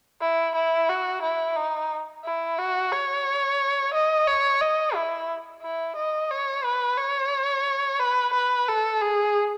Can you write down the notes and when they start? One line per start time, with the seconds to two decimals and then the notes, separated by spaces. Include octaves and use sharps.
0.21 E4
0.55 E4
0.89 F#4
1.22 E4
1.56 D#4
2.24 E4
2.58 F#4
2.92 C#5
3.94 D#5
4.27 C#5
4.61 D#5
4.94 E4
5.62 E4
5.96 D#5
6.30 C#5
6.64 B4
6.97 C#5
7.99 B4
8.33 B4
8.68 A4
9.01 G#4